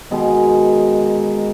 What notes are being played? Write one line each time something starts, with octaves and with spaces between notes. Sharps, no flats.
B2 D#3 G#3